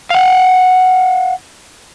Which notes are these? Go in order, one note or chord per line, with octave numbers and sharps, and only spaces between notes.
F5 F#5